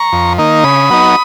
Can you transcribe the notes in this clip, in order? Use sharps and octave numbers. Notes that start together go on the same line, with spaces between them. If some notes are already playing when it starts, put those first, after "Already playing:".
Already playing: A#5 C#6
F2
D#3 A#3 D#4
C#3 B5 D#6
F#3 B3 D#4